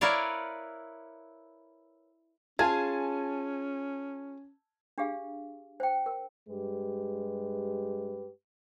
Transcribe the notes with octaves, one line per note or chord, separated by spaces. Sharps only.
E4 A#4 B4 C#5 D5 F5
C#4 F4 G#4 G#5 A5 G#6
D4 G4 G#4 F5
C5 G5
A#4
G2 G#3 G4 B4